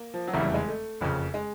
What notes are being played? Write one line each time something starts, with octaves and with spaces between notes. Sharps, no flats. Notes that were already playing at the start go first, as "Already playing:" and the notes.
Already playing: A#3
F3
F#3
F1 E2 C#3 E3 A3
G3
G#3
A3
F#1 F2 C#3
G#3